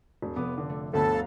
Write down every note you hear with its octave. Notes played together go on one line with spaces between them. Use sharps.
E1
F1 B3 D6 D#6
D3
A3
G1 D2 B3 A4 B5
F5 F#5 A#5